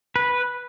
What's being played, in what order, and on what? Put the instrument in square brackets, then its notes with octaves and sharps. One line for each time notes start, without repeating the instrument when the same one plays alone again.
[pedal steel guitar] B4